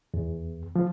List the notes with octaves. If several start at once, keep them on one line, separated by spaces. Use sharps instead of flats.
E2
F3